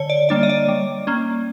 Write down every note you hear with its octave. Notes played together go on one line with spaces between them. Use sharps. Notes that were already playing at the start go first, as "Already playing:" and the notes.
Already playing: D3 C#5
D5
G3 A#3 D4 D5
D#5
D5
G3
A#3 C#4